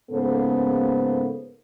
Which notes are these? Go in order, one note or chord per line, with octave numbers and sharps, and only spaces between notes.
G#2 C#3 A#3 B3 A4 C5